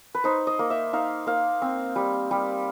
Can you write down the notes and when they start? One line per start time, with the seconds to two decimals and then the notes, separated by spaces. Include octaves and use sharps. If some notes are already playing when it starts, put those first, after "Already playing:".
0.14 B4
0.24 D#4 C5
0.47 D#5
0.59 A#3
0.70 E5
0.93 D#4 F5
1.27 A#3 F5
1.62 C4
1.96 G3
2.31 G3